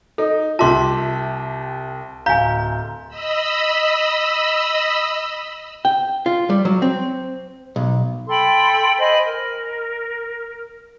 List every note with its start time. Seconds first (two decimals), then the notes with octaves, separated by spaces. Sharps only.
0.18 D#4 A4
0.59 C2 F4 G4 E5 A5 C6 D6
2.26 D1 F5 G#5 A#5 G6
3.08 D#5 B5 E6
5.85 G5
6.26 F4
6.50 G3
6.65 F#3
6.82 C4
7.76 B1
8.28 A4 G5 B5 C6
8.99 C5 D#5 G#5 B5
9.25 A#4